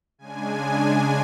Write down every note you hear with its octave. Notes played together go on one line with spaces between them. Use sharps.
C#3 G#3 D4 G#5